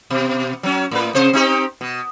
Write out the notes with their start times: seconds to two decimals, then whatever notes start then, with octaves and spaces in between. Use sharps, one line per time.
0.10 B2
0.63 F#3 C#4
0.91 A2 B4
1.15 C3 C5
1.33 C4 D#4 G4
1.81 B2